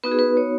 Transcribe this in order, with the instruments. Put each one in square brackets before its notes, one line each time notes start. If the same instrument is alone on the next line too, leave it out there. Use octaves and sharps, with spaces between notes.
[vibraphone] B3 D#4 F#4 B4
G#4
B4
C#5